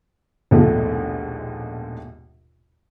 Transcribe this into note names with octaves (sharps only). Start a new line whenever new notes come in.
A#1 D#2 G#2 B2 F3 A3